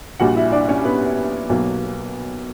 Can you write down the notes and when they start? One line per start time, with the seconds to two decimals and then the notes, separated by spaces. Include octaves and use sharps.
0.20 A#1 A#2 G3 F#4 F#5
0.36 E4 E5
0.52 D4 D5
0.69 C#4 C#5
0.84 B3 B4
1.49 B1 B2 F#3 A#3